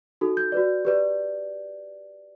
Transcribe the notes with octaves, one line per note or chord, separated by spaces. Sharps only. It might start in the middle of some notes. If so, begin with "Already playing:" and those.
D#4 F#4 A4
G6
F#4 B4 D5
G4 B4 D5